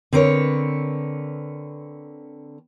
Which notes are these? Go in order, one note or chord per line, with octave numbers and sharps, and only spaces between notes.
D3 C4 A#4 B4 C#5